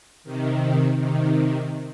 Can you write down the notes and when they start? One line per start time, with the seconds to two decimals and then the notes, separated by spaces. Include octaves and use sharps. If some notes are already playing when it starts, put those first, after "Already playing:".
0.24 C3 D#3
0.96 C3 D#3